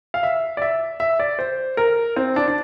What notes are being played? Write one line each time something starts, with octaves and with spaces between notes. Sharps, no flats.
F5
E5
D5
E5
E5
D5
C5
A#4
C4
D4
D4